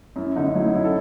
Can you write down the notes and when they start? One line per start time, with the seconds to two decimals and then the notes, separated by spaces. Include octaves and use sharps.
0.16 F#2 E4
0.36 D3 D#4
0.55 F#3 E4
0.65 D#4
0.75 F#2 E4
0.84 A4